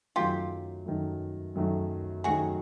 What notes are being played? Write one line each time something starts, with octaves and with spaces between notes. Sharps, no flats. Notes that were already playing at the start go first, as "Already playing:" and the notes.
F#2 D#3 F#3 A3 F4 G4
F#2 D#3 F#3 A3
F#2 D#3 F#3 A3
F#2 D#3 F#3 A3 F#4 G#4